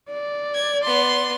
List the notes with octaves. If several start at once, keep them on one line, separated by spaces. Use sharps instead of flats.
D5
G#6
B3 C6